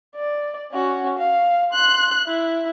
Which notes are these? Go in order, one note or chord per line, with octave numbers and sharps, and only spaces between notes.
D5
C#4 F#4
F5
C6 F#6
E4